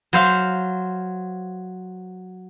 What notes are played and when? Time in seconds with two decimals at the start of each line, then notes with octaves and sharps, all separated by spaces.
0.13 F#3 C5 F5